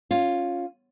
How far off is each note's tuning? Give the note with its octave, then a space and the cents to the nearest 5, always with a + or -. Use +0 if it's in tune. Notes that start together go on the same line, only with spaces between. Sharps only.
C#4 +0 F4 +5